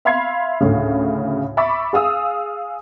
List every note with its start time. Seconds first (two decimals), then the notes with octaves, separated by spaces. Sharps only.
0.05 E5 F5 B5 C6 G#6 C7
0.61 D2 A2 C#3
1.57 E5 B5 C#6 D6 A6
1.93 G#4 F5 D#6 E6